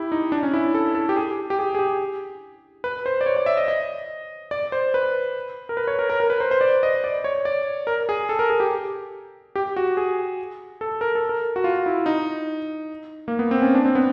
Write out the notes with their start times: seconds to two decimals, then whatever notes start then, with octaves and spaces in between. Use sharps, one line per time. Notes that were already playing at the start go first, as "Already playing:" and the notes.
Already playing: E4 G4
0.12 D#4
0.32 D4
0.43 C#4
0.54 E4
0.74 A4
0.95 A4
1.09 G4
1.16 G#4
1.50 G4
1.59 G#4
1.75 G#4
1.79 G4
2.84 B4
3.06 C5
3.21 D5
3.26 C#5
3.36 D5
3.46 E5
3.57 D#5
3.68 D#5
4.51 D5
4.72 C5
4.94 B4
5.69 A#4
5.77 B4
5.87 C#5
5.99 A#4
6.10 A#4
6.20 A#4
6.30 B4
6.40 C5
6.51 C5
6.61 D5
6.83 D#5
7.04 D5
7.24 C#5
7.45 D5
7.87 A#4
8.09 G#4
8.29 A4
8.39 A#4
8.49 G#4
8.60 G4
9.55 G4
9.76 F#4
9.97 G#4
10.81 A4
11.01 A#4
11.15 A4
11.29 A#4
11.56 F#4
11.64 F4
11.86 E4
12.06 D#4
13.28 A#3
13.39 B3
13.51 C4
13.62 C#4
13.75 D4
13.86 C4
13.95 B3